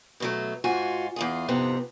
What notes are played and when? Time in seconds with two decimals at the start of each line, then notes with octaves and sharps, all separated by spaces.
0.20 B2 F#3 A3
0.64 G#2 F4 F#4 G#5
1.16 E2 F4 G#4
1.48 F2 G#2 C3 B3 C4